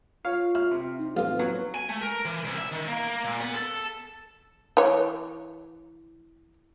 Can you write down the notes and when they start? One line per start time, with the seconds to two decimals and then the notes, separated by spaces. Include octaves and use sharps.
0.25 F4 C#5 F5
0.55 E4 F6
0.71 C3
0.99 D#4
1.17 A1 F2 F4 B4
1.39 F#3 B3
1.75 G#5
1.89 A3
2.02 A#4
2.25 E3
2.45 C2
2.58 E5
2.72 D#3
2.88 A#3
3.08 A#3
3.24 A#2
3.41 B3
3.55 A4
4.77 E3 C#5